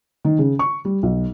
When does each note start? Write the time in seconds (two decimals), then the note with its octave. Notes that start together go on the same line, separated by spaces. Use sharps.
0.25 D#3
0.39 C#3
0.59 C#6
0.85 G3
1.03 B1